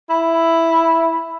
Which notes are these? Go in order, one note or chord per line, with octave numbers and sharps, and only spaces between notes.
E4